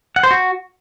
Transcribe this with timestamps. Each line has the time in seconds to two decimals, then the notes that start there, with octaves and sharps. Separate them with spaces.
0.16 F#5
0.23 C5
0.31 F#4